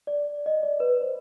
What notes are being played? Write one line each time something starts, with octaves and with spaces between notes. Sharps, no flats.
D5
D#5
D5
B4
C5